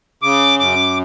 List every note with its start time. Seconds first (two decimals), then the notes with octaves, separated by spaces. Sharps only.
0.23 C#3 D6
0.60 F#2 D6